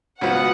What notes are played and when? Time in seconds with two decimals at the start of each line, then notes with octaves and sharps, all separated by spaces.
0.21 C#2 B2 F#3 B3 F4 F#5